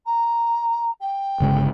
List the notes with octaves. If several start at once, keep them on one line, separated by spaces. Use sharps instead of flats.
A#5
G5
G1 C#3 G#3